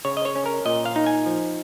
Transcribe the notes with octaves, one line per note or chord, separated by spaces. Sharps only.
C#3 C#5
D#5
C#5
C#4
A#4
A#2 D#5
F5
D#4
G#5
F3